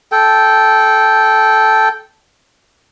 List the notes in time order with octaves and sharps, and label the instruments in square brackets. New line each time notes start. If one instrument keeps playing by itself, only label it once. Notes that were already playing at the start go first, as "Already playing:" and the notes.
[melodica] A4 G5